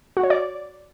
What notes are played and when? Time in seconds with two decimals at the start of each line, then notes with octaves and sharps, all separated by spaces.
0.17 F#4
0.23 C#5
0.30 D5